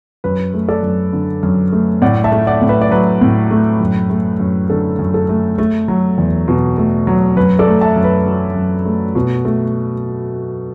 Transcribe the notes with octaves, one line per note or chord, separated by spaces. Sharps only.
F#2 B4
A3
A4 D5
F#2
D3
F#2
A3
A2 D5 F#5
E5 A5
A3
D5 F#5
A2
B4 E5
D5
F#3 B4
A2
A3
F#2
A3
F#2
D3 A4
F#2
A4
A3
A3
F#3
E2
B2
A3
F#3
F#2 B4
A4 D5
A3
E5 A5
F#2
B4
F#3
F#2
A3
B2
A3